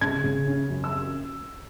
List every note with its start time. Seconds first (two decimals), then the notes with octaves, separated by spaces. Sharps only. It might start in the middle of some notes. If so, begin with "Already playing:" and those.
0.01 C#3 G#6
0.24 C#3
0.47 C#4
0.70 F#2
0.84 E6